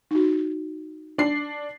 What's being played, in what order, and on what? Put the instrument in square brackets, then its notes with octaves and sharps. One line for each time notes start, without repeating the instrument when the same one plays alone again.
[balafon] D#4 F#4
[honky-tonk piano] D4 C7